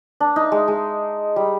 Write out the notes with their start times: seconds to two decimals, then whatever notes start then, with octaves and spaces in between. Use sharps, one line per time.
0.20 D4
0.36 D#4
0.52 G#3
0.68 G#3
1.36 G3